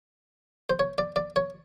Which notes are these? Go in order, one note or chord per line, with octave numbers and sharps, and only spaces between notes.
C5
C#5
D5
D5
C#5